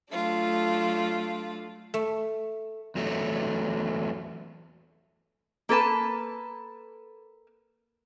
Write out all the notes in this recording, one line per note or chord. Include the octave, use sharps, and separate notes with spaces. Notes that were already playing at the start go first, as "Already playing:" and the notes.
F#3 A3 D4 F4
A3
E2 F#3 A3
A#3 A4 B4 A5